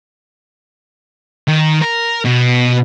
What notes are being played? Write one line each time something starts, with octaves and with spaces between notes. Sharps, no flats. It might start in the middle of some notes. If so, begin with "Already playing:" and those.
D#3
A#4
B2